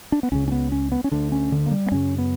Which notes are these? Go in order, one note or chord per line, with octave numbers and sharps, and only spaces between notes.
D4
B3
C#2 C#3 C#4
C#4
B3
C#4
B3
C#4
D2 D3 D4
C#4
D3
A#3
G3
B3
F#2 C#3 C#4
B3